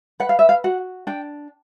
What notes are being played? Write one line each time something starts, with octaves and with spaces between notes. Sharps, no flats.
B4 F#5
F5
E5
F5
F#4 F#5
D4 G5